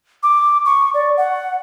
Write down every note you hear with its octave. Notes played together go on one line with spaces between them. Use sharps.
D6
C#6
D5
F#5